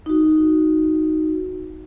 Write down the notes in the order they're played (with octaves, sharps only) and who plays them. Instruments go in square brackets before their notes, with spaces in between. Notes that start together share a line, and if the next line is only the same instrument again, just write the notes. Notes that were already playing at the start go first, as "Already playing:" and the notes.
[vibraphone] D#4 F#4